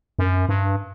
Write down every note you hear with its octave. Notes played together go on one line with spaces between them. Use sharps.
F#2
G2